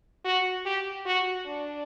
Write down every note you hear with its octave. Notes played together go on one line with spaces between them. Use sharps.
F#4
G4
F#4
D4